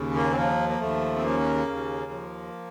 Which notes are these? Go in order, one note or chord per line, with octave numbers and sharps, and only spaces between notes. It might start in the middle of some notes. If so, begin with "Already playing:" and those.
Already playing: D#2 C#3
A#3
C4
F3 A#3
A#3
D#2 A3
C4
C#3 A#3
D#2
F3